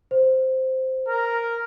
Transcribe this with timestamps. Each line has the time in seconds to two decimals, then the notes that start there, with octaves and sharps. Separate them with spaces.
0.11 C5
1.08 A#4